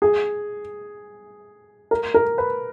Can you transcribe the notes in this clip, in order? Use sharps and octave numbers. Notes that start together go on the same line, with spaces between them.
G#4
A#4
A#4
B4